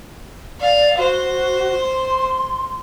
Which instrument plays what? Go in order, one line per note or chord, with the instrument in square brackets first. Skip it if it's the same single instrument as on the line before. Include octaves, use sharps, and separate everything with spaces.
[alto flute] D5 [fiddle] F5
[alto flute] F#4 [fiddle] C5
[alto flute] C6